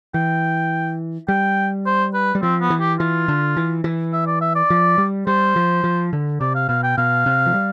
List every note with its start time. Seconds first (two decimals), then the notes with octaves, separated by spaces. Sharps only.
0.14 E3 G5
1.28 G3 G5
1.86 C5
2.14 B4
2.35 G3
2.43 F3 C4
2.61 B3
2.70 E3
2.80 G4
2.99 E3 F4
3.28 D3
3.57 E3
3.84 E3
4.13 E5
4.27 D5
4.41 E5
4.55 D5
4.70 F3
4.98 G3
5.27 G3 C5
5.56 F3
5.84 F3
6.13 D3
6.41 C3 D5
6.55 F5
6.69 B2 F5
6.84 G5
6.98 B2 F5
7.26 C3
7.46 F3
7.54 G3